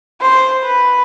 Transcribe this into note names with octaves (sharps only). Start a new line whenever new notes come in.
C5
B4